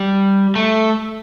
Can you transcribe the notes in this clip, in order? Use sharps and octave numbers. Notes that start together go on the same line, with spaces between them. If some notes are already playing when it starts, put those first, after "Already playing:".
Already playing: G3
A3